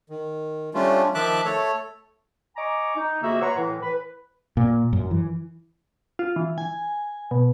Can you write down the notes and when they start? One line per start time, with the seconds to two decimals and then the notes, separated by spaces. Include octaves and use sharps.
0.10 D#3
0.74 G3 A3 C#4 D4 F4
1.15 D#3 F3 E5 A5 D6 F#6
1.45 A3 A4 C#5
2.56 D#5 G#5 A#5 C#6 D6
2.96 D#4
3.22 F2 C#3 A#3 F#4 D#5 E5
3.41 B4 C#5 F#5 A#5 C6 C#6
3.57 A2 E3
3.82 B4 B5
4.57 A#2
4.93 F#2
5.11 E3
6.19 F4
6.36 E3
6.58 G#5
7.31 B2